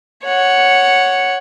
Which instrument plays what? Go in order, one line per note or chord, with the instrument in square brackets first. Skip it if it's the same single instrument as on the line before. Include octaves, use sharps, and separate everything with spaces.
[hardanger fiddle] C#5 F#5